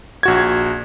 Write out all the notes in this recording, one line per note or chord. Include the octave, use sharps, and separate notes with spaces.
A#1 F#4 G#6